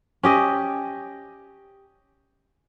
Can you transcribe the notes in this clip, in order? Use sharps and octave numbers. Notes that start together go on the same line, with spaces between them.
C#4 G4 D#5